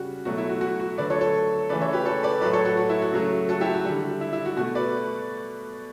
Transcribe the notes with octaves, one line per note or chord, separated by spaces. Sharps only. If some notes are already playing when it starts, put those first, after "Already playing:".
Already playing: C#3 G3 F#4
B2 F#3 A3 F#4
E4
F#4
F#4
F#4
D3 F#3 A3 B4 D5
A4 C#5
A4 C#5
C#3 E3 A3 B4 D5
C#5 E5
G4 B4
A4 C#5
B4 D5
A2 F#3 A3 B4 D5
A4 C#5
F#4 A4
F#4
E4
F#4
C#3 F#3 A3 F#4
F#4 A4
E4 G4
F#4
D3 G3
E4
E4
F#4
B2 A3 F#4
B4 D5